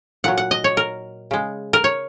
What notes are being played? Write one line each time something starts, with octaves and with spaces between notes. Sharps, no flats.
A#2 F#3 F#5
F#5
D#5
C#5
A#4
C#3 G#3
A#4
C#5